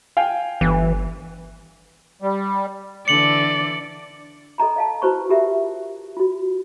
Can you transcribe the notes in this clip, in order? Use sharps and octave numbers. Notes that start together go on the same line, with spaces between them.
F5 G5 G#5
G1 E3
G3
D3 E3 D5 C#7 F#7
A4 D#5 A#5 B5
D#5 F5 A5
E4 F#4 B4 C5 B5 C#6
F4 G4 A#4 E5
F4 F#4